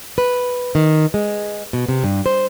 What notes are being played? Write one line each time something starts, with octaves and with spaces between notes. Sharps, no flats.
B4
D#3
G#3
B2
C3
G2
C5